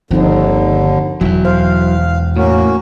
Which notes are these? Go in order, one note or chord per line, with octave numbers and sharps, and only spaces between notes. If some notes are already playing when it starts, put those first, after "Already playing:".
G1 D#2 D3 F3 C4 D#4
E1 E2 F#3 E4
C5 F5
A2 A#3 C#4 F#4